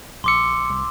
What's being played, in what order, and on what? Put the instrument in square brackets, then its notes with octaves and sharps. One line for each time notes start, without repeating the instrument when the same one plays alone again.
[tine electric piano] A#1 C#7 [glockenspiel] C6 D6 E6
[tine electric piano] C2